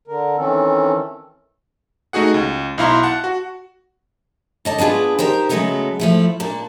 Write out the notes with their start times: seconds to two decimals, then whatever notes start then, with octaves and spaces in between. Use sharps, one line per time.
0.07 D3 A#4
0.37 D#3 E3 C4 C#4 A4
2.13 A3 D#4 F#4 G#4 F#5
2.34 C#2
2.78 B1 E4 F5 A#5 C6
3.03 F#5 A5
3.24 F#4
4.65 D3 D#5 A5
4.78 B3 D4 F4 G#4 B4
5.19 D#4 G4 A#4 C5
5.49 C#3 F#3 G#3 A3 B3 A4
6.00 F3 A3 E4
6.40 A#2 A#3 D4